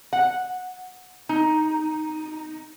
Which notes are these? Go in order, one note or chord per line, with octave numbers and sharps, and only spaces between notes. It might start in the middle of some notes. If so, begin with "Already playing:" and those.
F#5
D#4